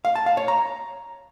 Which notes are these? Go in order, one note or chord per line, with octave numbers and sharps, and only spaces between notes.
F5
A5
F5
C#5
A#5